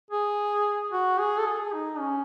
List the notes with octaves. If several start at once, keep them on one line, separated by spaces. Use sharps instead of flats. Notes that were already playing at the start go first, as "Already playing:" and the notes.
G#4
F#4
G#4
A4
G#4
D#4
C#4